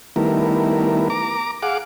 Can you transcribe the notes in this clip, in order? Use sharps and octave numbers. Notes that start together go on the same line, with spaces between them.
D#3 G3 A3 B3 E4 A#4
A#5 D6
G#4 F5 F#5 D6